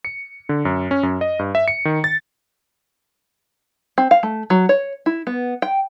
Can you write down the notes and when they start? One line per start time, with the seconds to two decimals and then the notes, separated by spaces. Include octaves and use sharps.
0.05 C#7
0.49 D3
0.65 F#2
0.91 C#4
1.03 F#2
1.21 D#5
1.39 G2
1.55 E5
1.68 C#7
1.85 D#3
2.04 A6
3.98 C4
4.11 F5
4.23 A3
4.50 F#3
4.69 C#5
5.06 E4
5.27 B3
5.62 G5